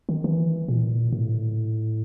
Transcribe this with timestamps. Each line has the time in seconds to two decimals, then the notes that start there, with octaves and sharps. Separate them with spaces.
0.09 D#3
0.24 E3
0.68 A#2
1.12 A2